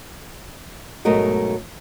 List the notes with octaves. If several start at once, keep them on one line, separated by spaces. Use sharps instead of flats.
G#2 B2 F#3 A3 A#4 D#5